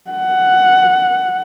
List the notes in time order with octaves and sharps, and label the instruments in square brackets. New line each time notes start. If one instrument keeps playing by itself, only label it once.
[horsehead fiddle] F#5